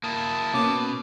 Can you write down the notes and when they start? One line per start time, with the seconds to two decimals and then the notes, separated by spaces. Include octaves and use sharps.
0.04 A#3 E4 A5 D#6
0.54 B2 A#3 C#4 D6